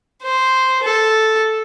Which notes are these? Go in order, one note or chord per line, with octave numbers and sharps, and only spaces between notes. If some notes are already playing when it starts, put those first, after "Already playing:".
C5
A4